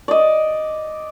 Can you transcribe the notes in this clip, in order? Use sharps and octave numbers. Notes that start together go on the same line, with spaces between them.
D5 D#5